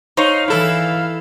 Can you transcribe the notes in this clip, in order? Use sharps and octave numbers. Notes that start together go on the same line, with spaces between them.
D#4 C5 C#5 F5
E3 E4 A4